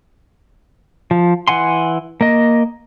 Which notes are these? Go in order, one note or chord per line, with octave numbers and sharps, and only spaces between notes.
F3
E3 F#5 G#5 C6
A#3 D#5